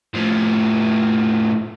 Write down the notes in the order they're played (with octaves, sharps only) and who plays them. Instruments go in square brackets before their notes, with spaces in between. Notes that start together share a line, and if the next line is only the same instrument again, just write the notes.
[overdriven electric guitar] A2 F3